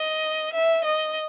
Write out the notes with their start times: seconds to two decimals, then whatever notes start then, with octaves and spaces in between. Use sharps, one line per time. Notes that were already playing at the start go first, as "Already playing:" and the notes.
Already playing: D#5
0.53 E5
0.84 D#5